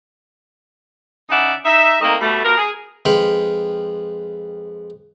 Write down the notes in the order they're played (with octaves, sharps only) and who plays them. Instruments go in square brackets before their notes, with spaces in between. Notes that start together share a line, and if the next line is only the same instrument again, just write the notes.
[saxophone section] C#3 D#4 D5 E5 F#5
D#4 E5
D#3 A3 A#3 C4 D#5
B2 G3 A3
B2 F3 A#4
G#4
[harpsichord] F2 G#3 B4 F5 G5 B5